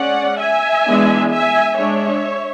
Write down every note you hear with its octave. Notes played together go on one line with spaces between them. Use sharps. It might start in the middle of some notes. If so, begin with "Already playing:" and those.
Already playing: G#3 C#4 D5 F#5
E5 G#5
E3 G#3 B3 D4
E5 G#5
G#3 D4 C#5 E5